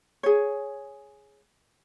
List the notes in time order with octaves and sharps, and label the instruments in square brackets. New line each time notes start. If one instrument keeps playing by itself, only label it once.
[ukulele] G#4 C#5